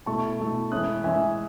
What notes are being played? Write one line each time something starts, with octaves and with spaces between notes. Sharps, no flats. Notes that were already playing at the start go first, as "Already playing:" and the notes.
B2 A3 E4 A5 C#6
B2 A3 E4
E3 G#3 C#4 E4 D#6 F#6
E3 G#3 C#4 E4 E5 G#5